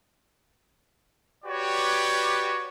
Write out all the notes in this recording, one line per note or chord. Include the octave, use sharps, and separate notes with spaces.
F#4 G4 B4 C#5 D5